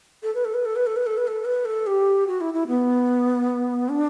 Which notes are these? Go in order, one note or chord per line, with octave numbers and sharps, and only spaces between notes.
A4
B4
A4
B4
A4
B4
A4
B4
A4
B4
A4
B4
A4
G4
F#4
E4
E4
B3
D4